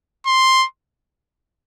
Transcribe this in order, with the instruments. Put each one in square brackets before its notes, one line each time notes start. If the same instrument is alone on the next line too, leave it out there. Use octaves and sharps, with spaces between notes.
[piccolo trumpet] C6